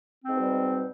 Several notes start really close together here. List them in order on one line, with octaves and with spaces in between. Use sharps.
C4 G#2 B2 G3